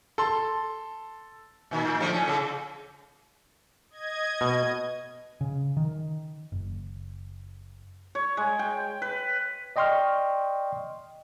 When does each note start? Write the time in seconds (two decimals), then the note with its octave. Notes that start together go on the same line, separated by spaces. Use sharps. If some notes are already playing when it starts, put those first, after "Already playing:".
0.18 A4 C6
1.71 A#2 D#3
1.85 A2
2.00 D3 F3 A3
2.13 A2 C#4
2.28 C#3
3.90 D#5 G#6
4.41 B2
5.41 C#3
5.77 D#3
6.52 F#1
8.15 C#5
8.37 G#3
8.59 G5
9.02 B4
9.76 D5 D#5 G5 C6 C#6 F6